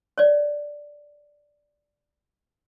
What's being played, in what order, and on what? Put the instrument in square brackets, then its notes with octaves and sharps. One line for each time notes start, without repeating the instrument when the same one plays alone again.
[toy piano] C#5 D5